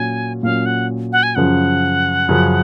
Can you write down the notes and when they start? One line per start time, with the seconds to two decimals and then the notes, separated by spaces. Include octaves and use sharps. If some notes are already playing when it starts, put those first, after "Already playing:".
Already playing: A#2 F#3 C#4 G#5
0.43 A#2 F#3 C#4 F5
0.66 F#5
1.12 F#5
1.23 G#5
1.35 F#2 C#3 F3 F#5
2.29 F#2 C#3 F3